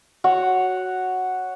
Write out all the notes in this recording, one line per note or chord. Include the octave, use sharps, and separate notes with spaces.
F#4 C#5 F#5